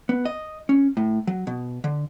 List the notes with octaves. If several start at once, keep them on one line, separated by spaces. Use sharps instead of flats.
B3
D#5
C#4
A2
F#3
B2
D3